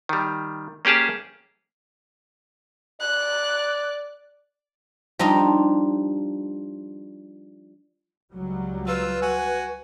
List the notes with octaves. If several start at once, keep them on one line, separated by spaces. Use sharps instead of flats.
D#3 G3
A#3 C#4 G4 G#4 A5
D5 F#6
F3 G3 D4 D#4 F4 D#5
C#2 F#3 G3
F4 B4 E6
F#4 G#5